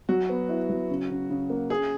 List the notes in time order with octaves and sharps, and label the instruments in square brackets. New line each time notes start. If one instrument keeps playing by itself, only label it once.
[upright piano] F#3 [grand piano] F#4
[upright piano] B3
E4
F#3
C#3
C#3
C#3
A#3
[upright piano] C#4 [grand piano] G#4